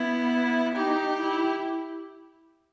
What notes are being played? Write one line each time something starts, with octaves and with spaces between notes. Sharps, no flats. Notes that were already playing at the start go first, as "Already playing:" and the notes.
Already playing: B3 E4
D#4 G4
E4